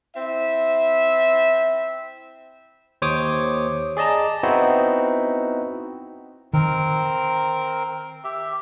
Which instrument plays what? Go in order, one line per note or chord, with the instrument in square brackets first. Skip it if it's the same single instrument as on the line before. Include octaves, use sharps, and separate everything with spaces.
[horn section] C4 E4 E5
[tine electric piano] D#2 C5 C#5 D6 D#6
G#4 D5 D#5 A5 A#5
B3 C4 D#4 E4 F#4
[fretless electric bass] D#3 [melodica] C4 A#4
[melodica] G4 E5